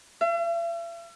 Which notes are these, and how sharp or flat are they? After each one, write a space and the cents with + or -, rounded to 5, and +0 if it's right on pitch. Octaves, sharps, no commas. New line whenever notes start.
E5 +45